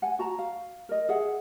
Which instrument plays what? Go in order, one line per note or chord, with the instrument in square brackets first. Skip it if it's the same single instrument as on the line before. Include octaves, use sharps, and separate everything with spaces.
[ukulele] F#5 G#5
F#4 A5 A#5
F5
A#4 D#5
G#4 E5 F#5